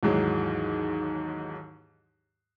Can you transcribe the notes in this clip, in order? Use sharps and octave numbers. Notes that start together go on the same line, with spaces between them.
D#2 G#2 E3 F#3 G#3